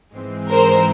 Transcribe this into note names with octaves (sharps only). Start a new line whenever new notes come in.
G#2 E3 G#3 C4
A#4 C5